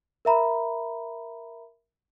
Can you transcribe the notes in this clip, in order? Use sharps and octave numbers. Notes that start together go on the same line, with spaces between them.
A#4 E5 A#5 B5